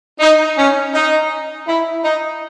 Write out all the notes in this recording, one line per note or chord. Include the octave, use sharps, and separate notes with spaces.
D#4
C#4
D#4
E4
D#4